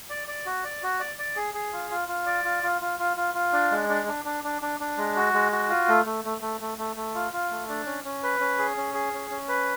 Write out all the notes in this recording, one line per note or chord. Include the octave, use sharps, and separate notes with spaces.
D5
D5
F#4
D5
F#4
D5
D5
G#4
G#4
F4
F4
F4
D5
F4
F4
F4
F4
F4
F4
D4
G#3
D4
D4
D4
D4
D4
D4
G#3
F#4
G#3
F#4
F4
A3
A3
A3
A3
A3
A3
A3
F4
F4
A3
D4
C#4
C#4
B4
C#4
G#4
C#4
G#4
C#4
C#4
B4